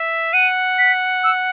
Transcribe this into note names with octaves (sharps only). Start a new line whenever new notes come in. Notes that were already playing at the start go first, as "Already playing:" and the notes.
Already playing: E5
F#5 D#7
B6
E6